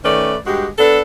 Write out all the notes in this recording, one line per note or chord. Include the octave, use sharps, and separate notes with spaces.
D#3 A3 C#4 B4 D5
G2 G#3 F#4 G4
B3 D4 A4